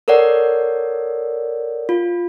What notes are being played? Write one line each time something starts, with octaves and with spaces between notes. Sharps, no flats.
A4 A#4 C#5 D5 F#5
F4